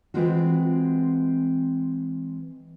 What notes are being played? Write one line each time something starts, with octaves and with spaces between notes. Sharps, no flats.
E3 G#3 C4 F4 F#4